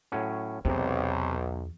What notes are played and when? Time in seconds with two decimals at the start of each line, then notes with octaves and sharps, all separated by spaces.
0.12 A2 F#3 C#4
0.65 B1 E2 C3 G#3